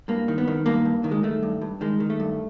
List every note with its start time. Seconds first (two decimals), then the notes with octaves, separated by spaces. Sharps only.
0.08 G2 A#3
0.28 D#3
0.38 B3
0.48 D#3
0.66 G2 A#3
0.85 G2
1.04 D#3
1.11 G#3
1.23 D#3 A3
1.43 G2
1.61 G2
1.81 D#3 G#3
2.00 D#3
2.10 A3
2.20 G2